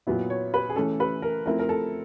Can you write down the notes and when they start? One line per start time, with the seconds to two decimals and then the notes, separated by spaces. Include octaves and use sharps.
0.07 A#2 F#3 B3 E4
0.30 C#5
0.54 B4
0.69 G#4
0.76 E3 A3 C#4 A4
1.00 B4
1.22 A#4
1.46 F3 A3 C4 E4 A#4
1.59 A#4
1.69 A4